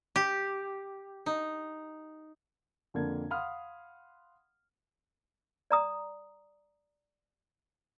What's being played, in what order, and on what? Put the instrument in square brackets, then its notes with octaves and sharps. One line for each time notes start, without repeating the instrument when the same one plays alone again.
[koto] G4
D#4
[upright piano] F2 D3 A#3 G#6
F5 F#5 B5 C6 D#6 F6
[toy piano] D5 A#5 D#6